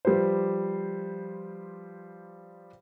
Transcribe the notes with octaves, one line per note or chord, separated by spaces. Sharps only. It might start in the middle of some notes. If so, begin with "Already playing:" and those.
F3 G3 G4 B4 C5